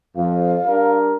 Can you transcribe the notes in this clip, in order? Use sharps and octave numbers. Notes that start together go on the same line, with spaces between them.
F2 F5
G3 D4 A#4